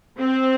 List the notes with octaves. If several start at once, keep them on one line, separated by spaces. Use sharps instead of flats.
C4